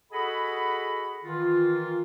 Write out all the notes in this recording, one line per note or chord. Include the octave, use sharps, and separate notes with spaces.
F#4 G#4 A4 D#5 F#5 B5
D#3 E3 F4